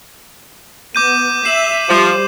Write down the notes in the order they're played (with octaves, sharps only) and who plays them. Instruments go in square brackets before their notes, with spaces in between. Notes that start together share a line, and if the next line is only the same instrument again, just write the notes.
[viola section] B3 [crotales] D6 G6 D#7
[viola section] E5 [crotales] C7 E7 F#7
[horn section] F3 [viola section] G3 C5